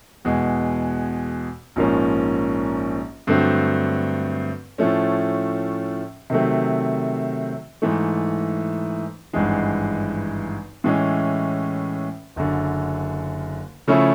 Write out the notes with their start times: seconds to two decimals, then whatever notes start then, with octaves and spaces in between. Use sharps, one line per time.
0.25 E2 B2 G#3
1.76 A#1 G#2 F3 A#3 C#4
3.27 G2 D3 F#3 A3 C4
4.78 A2 F3 A3 C#4
6.30 C3 D#3 F#3 A3 C4
7.82 G#2 E3 A3
9.33 G#1 G2 E3 G#3
10.84 A2 E3 G#3 C#4
12.36 F#1 F#2 D3
13.88 C#3 F3 A3 C#4 E4